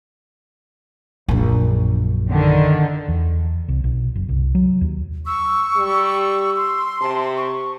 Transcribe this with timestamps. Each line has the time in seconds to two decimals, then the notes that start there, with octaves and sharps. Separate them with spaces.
1.28 A#1 F#2
2.29 D3 D#3
3.08 E2
3.68 C2
3.84 B1
4.15 F#1
4.29 C2
4.55 F#3
4.81 D#2
5.26 C#6 E6
5.77 G3
6.57 C6
7.01 C3 A5
7.37 C#6